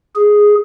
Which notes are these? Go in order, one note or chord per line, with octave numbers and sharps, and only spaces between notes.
G#4